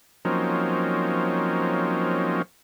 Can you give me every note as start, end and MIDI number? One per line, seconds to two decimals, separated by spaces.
0.25 2.42 53
0.25 2.42 54
0.25 2.42 58
0.25 2.42 60
0.25 2.42 61
0.25 2.42 63